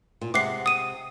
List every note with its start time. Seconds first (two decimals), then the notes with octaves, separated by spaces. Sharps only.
0.21 A#2
0.34 C3 G#3 F#5 D6 C7
0.66 D#6 D#7